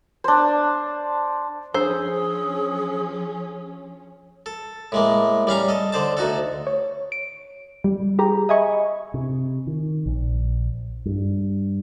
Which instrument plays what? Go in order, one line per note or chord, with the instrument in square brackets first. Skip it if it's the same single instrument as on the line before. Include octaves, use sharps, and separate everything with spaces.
[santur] D4 C5
[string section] F3 C#4 [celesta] D4 E6 [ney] G#4 [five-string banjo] C5
[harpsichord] A4
A2 G#3 A#3
G3 C#4 F5 A#5
A4 D#5
D3 C5 A5
D2 D#4 F#4 A4
[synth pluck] C#5
D7
G3
G4 G#4 A#5
D#5 E5 G#5 B5 C#6
[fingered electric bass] C3
D#3
A#1
G2